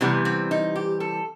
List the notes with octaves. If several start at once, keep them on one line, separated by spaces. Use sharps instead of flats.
C3 E3 G3 B3
C4
D#4
G4
A4